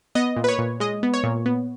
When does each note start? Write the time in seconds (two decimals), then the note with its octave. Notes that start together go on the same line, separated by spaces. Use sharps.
0.15 B3 D#5
0.36 A#2
0.44 B4
0.48 C#5
0.58 A#2
0.80 G#3 D#5
1.03 B3
1.14 C#5
1.24 A#2
1.46 B3